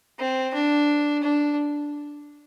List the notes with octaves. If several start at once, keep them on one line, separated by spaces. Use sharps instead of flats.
C4
D4
D4